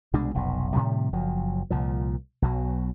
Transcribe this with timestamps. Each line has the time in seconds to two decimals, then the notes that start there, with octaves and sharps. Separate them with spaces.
0.13 C2 B2 G#3 D4
0.35 F1 B1 B2
0.73 A2 C3 D#3 G3
1.13 F#1 F3 F#3
1.70 C2 A#2 F3
2.42 B1 B2 F#3